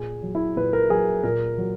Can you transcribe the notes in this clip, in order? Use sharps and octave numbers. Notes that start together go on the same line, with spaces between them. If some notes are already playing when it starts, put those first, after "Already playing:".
Already playing: A#2 G#4
F#3
E4
A#2 B4
A#4
F#3 G#4
A#2 A#4
F#3